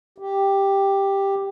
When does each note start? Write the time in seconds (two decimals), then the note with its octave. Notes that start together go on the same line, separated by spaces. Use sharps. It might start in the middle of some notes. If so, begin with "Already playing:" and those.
0.18 G4